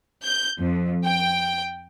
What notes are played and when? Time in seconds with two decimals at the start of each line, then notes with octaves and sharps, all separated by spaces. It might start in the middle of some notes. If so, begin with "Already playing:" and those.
0.22 G6
0.59 F2
1.05 G5